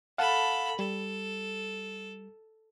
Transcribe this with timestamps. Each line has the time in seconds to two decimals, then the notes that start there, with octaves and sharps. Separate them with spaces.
0.18 A4 F5 F#5 A5 B5
0.79 G3 A4